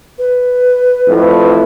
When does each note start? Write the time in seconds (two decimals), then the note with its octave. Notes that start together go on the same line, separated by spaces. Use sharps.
0.18 B4
1.08 F2 A2